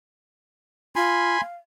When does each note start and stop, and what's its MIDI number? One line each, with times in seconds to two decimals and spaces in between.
0.96 1.40 65
0.96 1.41 80
0.96 1.41 83
0.96 1.41 84
1.40 1.55 77